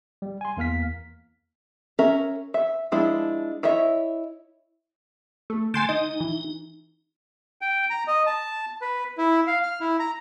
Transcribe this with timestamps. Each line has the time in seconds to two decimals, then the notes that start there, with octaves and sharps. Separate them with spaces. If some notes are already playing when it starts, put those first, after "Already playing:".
0.22 G3
0.41 G#5 C6
0.57 E2 A#3 F5 F6 B6
1.99 C#4 A#4 E5
2.54 E5
2.92 F3 G#3 D4 E4
3.63 E4 C#5 D#5 E5
5.50 A3
5.74 D3 A3 G#5 C6 G6
5.89 D#4 D#5
6.20 E3
7.61 G5
7.90 A#5
8.07 D#5
8.27 A5
8.82 B4
9.18 E4
9.47 F5
9.63 F6
9.81 E4
9.99 A#5